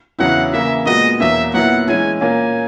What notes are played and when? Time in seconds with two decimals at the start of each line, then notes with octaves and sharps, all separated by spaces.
0.19 E2 C#3 F#3 C#4 E4 F#5
0.53 C#3 E3 A#3 E4 E5
0.86 A#2 G#3 B3 F#4 D#5
1.20 E2 B2 F#3 A#3 E5
1.54 A#2 F#3 B3 E4 F#5
1.87 E3 G#3 C#4 E4 G#5
2.21 A#2 A#3 C#4 G#5